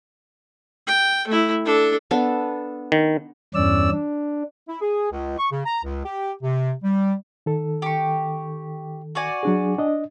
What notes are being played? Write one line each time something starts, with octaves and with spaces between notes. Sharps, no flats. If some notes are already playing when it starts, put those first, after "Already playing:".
G5
A3 E4
D4 A4
B3 D4 A4
D#3
E2 G2 C#4 D5 E6
D4
E4
G#4
C#2
C#6
C#3
A#5
C#2
G4
C3
G3
D#3 A4
G4 C#6
F#4 D5 G#5
F#3 D4 G#4
D4 D#5